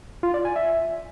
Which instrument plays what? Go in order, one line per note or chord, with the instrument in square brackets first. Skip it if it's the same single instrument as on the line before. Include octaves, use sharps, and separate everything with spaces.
[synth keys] F4
D5
G#5
E5